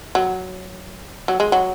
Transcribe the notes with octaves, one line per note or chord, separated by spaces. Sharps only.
F#3
F#3
G#3
F#3